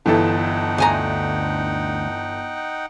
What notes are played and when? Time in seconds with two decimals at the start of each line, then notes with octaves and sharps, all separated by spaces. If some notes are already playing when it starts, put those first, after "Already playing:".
0.06 G1 E3 D#4 A4 F#5 G5
0.78 D2 G#5 A#5